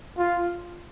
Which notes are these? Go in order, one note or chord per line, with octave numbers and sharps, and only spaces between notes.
F4